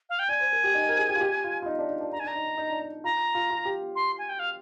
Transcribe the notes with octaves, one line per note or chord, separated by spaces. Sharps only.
F5
G5
D5 G#5
C5
A#4
G4
D#4
A#4
G#4
G4
F4
G4
F4
F4
D#4
D4
D#4
D4
D#4 A#5
G#5
D4
A#5
D#4
D4
D#4
D4
D#4
F4 A#5
F4
F4
G4
C6
G#5
G5
F5